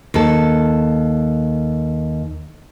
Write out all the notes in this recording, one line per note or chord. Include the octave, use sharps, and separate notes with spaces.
D#2 A4